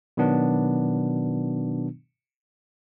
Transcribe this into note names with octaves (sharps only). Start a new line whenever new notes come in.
B2 D#3 F#3 B3 D4